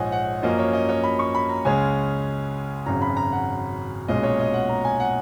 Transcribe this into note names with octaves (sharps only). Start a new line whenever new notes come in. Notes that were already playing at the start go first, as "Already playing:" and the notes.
Already playing: A#1 G#2 F3 C#5 D#5 F#5 G#5
F#5
F#2 F3 A#3 C#4 D#5
C#5
D#5
C#5
B5
C#6
B5
A#5
C#2 C#3 G#3 C#4 G#5
G#1 F#2 C#3 F#3 A#5
B5
A#5
F#5
B1 A#2 G#3 C#4 D#5
C#5
D#5
F#5
A#5
G#5
F#5